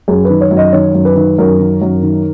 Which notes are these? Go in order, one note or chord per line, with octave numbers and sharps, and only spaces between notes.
F#2 G#4
B4
D#3
C#5
F#2
D#5
D#3 C#5
F#2
B4
D#3
F#2 A#4
D#3
F#2
D#3